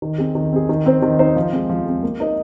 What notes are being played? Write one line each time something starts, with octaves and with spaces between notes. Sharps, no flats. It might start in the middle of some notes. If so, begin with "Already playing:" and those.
D#3
C4 G#4
D#3
C4 G#4
D#3
C4 D#4 C5
D#3
C4 D#4 C5
F3
G#3 C4
F3
G#3 C4
A#3
D#4 A#4 D#5